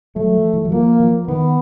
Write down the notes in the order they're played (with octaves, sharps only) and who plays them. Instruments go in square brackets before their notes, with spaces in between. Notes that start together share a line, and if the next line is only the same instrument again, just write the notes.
[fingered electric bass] F#3 [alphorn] A3
[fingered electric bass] F3
E3
F#3
[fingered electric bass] F3 [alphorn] A#3
[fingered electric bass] F3
[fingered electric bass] D#3 [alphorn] B3